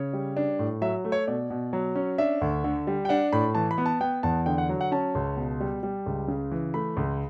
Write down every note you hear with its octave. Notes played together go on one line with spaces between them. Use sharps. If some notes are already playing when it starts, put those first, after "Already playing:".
Already playing: C#3 C#5
G3
D4
A2
F#3 E5
A3
C#5
B2 D5
B2
F#3
C#4
D4 E5
D2
D3
G3
G5
D4 F#5
A2 B5
E3 A5
B5
B3
A5
B3 G5
E2 A5
D3 G5
F#5
F#3
F#5
C#4 A5
C#2
B2
G3
G3
C#2
C#3
E3
A3 B5
C#2